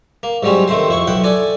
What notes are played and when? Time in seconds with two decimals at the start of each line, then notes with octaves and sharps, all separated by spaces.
0.23 A#3
0.43 G#2 F#3 G3 C4 C#4
0.68 D#3 A3 C4 C5
0.88 F2 E4 C#6
1.07 B1 E4 F#5 G5
1.24 A4 D5 G#5